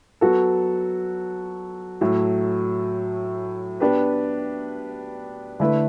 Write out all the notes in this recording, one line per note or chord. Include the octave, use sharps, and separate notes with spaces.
F#3 B3 F#4 A4
A2 F#3 A3
B3 D4 G4 B4
D3 A3 E4 B4